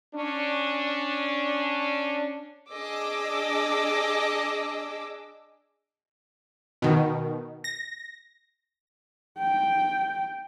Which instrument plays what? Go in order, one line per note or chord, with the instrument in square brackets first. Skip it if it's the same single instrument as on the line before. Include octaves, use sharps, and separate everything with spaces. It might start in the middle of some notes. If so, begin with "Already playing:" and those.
[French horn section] C#4 D4
[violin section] D4 G#4 D#5 D6 E6
[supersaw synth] B2 D#3
A#6
[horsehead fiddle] G5